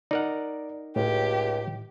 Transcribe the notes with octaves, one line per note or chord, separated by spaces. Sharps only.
D#4 A#4 D5 F#5
C#2 A2 G4